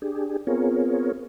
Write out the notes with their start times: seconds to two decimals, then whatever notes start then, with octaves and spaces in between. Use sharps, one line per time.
0.02 D4 G4 G#4
0.47 B3 C4 F4 G#4 A#4 C#5